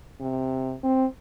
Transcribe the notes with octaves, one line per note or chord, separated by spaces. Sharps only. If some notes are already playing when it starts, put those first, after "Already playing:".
C3
C4